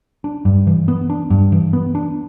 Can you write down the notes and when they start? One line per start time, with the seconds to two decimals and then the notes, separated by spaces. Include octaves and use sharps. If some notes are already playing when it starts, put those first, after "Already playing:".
0.24 D4
0.45 G2
0.67 E3
0.88 B3
1.10 D4
1.30 G2
1.52 E3
1.73 B3
1.95 D4